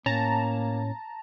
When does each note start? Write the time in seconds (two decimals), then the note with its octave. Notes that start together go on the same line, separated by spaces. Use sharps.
0.06 A2 A#3 C#4 A5 A#5